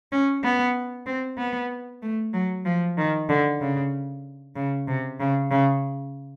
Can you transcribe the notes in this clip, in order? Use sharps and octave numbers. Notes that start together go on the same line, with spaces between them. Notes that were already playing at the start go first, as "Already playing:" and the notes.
C#4
B3
C4
B3
A3
F#3
F3
D#3
D3
C#3
C#3
C3
C#3
C#3